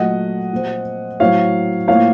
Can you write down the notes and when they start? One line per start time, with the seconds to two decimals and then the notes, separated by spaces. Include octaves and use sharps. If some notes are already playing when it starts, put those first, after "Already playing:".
Already playing: A#2 F#3 A3 D#5 F#5
0.52 A#2 F3 C4
1.20 A2 F#3 C4 C#5 F5
1.88 A2 F3 A#3 C#5 F5